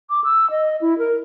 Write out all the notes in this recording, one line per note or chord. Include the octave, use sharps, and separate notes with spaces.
D6
E6
D#5
E4
A#4